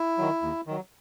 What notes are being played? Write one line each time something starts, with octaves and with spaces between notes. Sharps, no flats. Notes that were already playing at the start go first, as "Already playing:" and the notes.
Already playing: E4
D#3 F#3
D#2
D#3 F#3